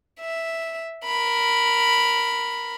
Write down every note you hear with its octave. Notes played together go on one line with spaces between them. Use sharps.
E5
A#4 B5